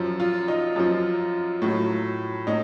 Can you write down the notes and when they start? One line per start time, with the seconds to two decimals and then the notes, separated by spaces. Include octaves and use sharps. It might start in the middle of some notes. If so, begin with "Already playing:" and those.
Already playing: F#2 F3
0.20 F4
0.48 D#4
0.76 F#2 F3
1.62 A2 F#3
2.47 A2 D#4